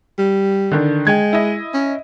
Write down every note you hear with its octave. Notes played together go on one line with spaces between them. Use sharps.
G3
D3 D#3 D4
G#3 G5 G#6
E4 D#5
C#4